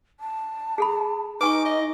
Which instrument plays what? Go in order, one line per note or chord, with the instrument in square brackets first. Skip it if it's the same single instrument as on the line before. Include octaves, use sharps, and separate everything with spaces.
[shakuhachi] A5
[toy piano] G#4 A4 B5
[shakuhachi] D#4 [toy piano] B4 G#5 C#6 [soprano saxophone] D6
[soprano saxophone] D#5